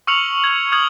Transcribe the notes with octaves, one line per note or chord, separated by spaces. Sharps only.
C#6 E6 F6 C#7 F7 F#7
G#6 F#7
D#6 F6 G#6 F#7